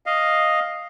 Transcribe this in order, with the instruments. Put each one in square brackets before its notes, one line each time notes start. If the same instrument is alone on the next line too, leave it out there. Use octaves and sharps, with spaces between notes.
[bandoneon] D#5 F5